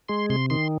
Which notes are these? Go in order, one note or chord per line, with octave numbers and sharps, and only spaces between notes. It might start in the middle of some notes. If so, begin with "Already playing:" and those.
G#3 C6
C3 C6
D#3 C6